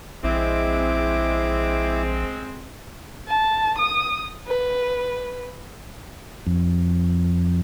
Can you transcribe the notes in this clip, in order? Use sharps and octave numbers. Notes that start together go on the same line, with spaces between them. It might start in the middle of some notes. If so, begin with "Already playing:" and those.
A#1 G#3 C4 E4 D6
A5
D#6
B4
F2